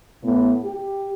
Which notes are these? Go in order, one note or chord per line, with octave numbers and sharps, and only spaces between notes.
A2 B3
G4